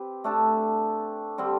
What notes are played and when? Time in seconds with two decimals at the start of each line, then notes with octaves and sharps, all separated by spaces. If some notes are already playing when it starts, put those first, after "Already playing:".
Already playing: C4 G4 B4
0.24 A3 D4 A4
1.38 D3 G3 C4